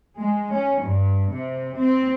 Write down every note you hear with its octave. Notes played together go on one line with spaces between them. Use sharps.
G#3
C#4
G2
C3
C4